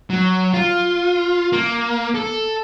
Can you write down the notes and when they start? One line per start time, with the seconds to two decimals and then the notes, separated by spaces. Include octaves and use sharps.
0.10 F#3
0.54 F4
1.53 A#3
2.15 A4